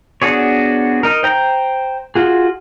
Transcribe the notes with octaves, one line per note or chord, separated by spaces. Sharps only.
B3 D4 F#4 G#4 C#5
D#4 A#4
C5 G5 A#5
F4 F#4 G#4